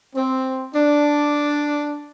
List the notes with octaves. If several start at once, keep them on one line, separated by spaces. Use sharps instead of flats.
C4
D4